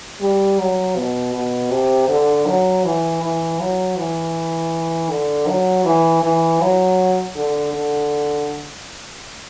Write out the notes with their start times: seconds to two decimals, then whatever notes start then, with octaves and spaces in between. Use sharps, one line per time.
0.21 G3
0.59 F#3
0.96 B2
1.33 B2
1.71 C3
2.09 D3
2.46 F#3
2.84 E3
3.22 E3
3.59 F#3
3.97 E3
5.10 D3
5.47 F#3
5.85 E3
6.22 E3
6.61 F#3
7.36 D3
7.74 D3